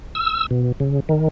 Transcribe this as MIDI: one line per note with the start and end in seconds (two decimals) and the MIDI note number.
0.15 0.46 88
0.51 0.72 47
0.80 1.00 49
1.09 1.28 51